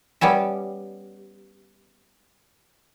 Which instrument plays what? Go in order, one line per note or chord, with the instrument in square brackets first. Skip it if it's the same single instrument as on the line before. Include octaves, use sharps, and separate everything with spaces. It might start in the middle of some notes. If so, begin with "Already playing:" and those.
[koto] G3 B3 C#4 E5